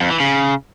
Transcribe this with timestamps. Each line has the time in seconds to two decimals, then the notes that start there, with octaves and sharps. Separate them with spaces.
0.01 F2
0.10 E3
0.20 C#3